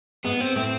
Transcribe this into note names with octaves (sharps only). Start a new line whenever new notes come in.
G#2 G#3 B3
C4
A2 A3 C4